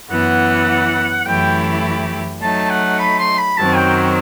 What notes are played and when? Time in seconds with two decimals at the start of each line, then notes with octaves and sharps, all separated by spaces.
0.11 F#2 E3 B3 F#5
1.26 F#2 E3 A3 E4 G4 G5
2.42 F#3 A3 D#4 A5
2.70 F#5
2.99 B5
3.19 C6
3.38 B5
3.58 F#2 D#3 F#3 C4 A5
3.76 G5